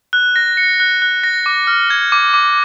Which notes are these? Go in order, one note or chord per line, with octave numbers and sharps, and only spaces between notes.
F#6
A#6
C#7
F#6
F#6
A#6
D6
F6
G#6
D6
D6